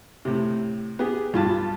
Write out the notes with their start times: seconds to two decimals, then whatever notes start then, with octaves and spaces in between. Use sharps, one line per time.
0.25 A2 C3
0.99 B3 G4 G#4
1.33 B1 G2 F4 G4 A5